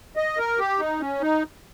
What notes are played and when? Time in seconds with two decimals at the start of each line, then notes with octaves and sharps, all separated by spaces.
0.16 D#5
0.38 A#4
0.59 G4
0.79 D#4
1.00 C#4
1.21 D#4